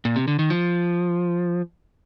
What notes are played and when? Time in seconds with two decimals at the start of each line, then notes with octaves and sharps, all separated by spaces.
0.05 A#2
0.16 C3
0.28 D3
0.39 D#3
0.50 F3